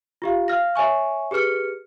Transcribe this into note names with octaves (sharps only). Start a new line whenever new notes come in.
F4 G4 F5
F5 F6 A#6
C#5 E5 G#5 C#6
G4 G#4 B4 F6 C#7